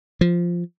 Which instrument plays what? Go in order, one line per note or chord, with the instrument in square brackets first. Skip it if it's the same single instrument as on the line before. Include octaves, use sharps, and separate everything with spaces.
[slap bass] F3